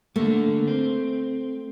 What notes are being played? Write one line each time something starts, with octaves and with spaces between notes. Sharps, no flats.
D3 A3 A#3
C4